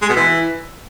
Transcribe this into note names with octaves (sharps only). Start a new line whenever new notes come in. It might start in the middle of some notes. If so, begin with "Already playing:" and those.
G#3
B2
E3